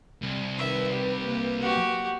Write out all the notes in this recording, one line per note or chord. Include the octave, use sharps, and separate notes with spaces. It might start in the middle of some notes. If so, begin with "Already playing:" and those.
C2
D#3 B4 E5
G4
A#3
F#4 G4